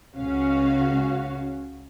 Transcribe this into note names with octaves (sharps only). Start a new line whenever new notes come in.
C#2 C#3 C#4 F#4 F5